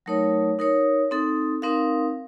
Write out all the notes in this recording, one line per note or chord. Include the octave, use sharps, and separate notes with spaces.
F#3 A3 D#4 A#4 C#5
D#4 A#4 C#5
C4 D#4 A4
C4 D#4 A#4 F5